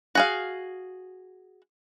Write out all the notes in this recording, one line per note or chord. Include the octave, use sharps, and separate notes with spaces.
F#4 G#4 F5